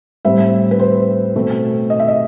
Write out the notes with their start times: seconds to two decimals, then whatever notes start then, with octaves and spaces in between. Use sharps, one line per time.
0.25 A2 G3 C4 E5
0.71 B4
0.79 C5
1.35 B2 A3 C4
1.90 D#5
2.00 E5
2.08 D#5